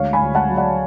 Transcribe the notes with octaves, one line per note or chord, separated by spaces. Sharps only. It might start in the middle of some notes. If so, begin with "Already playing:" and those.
Already playing: D2 G#3 C#5 F5
G#5 B5
D2
F#5 A5
F#3
D5 F#5